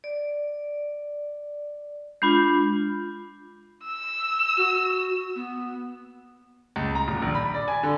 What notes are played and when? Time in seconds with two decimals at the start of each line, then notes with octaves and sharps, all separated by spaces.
0.04 D5
2.22 G#3 D4 F4 B5 G6
3.85 E6
4.57 F#4
5.36 B3
6.76 C#2
6.95 A#5
7.08 D#1
7.22 A#1
7.35 B5
7.54 D5
7.68 G#5
7.83 D3